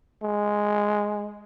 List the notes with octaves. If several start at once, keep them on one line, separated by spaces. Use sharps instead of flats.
G#3